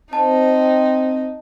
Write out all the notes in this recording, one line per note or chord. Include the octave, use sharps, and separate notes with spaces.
C4 D#4 A5